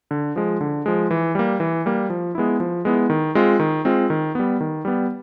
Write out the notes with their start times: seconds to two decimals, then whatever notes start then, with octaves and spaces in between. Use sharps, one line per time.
0.11 D3
0.36 F3 G#3
0.61 D3
0.86 F3 G#3
1.11 E3
1.35 G3 A#3
1.60 E3
1.86 G3 A#3
2.10 F3
2.35 G#3 B3 E4
2.60 F3
2.85 G#3 B3 E4
3.10 D#3
3.35 G#3 C4 F4
3.59 D#3
3.85 G#3 C4 F4
4.10 D#3
4.35 G3 B3
4.60 D#3
4.85 G3 B3